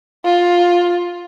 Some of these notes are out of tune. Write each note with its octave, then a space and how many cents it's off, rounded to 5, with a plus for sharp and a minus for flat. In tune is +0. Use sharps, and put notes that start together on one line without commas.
F4 +10